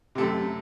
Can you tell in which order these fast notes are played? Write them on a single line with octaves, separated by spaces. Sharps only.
C3 A3 F#2